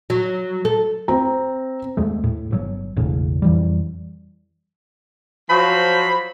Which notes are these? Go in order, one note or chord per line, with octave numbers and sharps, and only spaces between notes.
F#3
A4
C4 A#5
D#2 G#3 A3
A2
G1 C3 F#3
E1 A1 A2 C#3
F2 E3 G3
F3 F#3 C5 B5